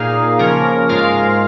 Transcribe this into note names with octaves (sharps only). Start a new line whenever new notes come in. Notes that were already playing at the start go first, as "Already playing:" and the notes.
Already playing: A#2 A#3 D#4 G#4 F5
C#3 F3 A#3 C#4 A#4
G#2 G#3 F4 A#4 F5